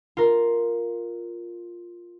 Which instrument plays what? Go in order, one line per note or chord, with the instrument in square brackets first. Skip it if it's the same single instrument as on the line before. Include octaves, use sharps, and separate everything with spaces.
[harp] F4 A#4